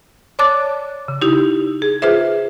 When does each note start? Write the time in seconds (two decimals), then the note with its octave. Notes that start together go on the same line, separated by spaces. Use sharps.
0.39 C#5 D5 A5 D6 F#6 A6
1.08 C#3
1.22 D#4 E4 G4
1.82 G#4
2.02 F4 G#4 B4 C5 E5